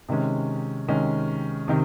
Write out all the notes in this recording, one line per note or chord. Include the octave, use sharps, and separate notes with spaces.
C3 D#3 G#3 C#4
C3 D#3 G#3 C#4
C3 D#3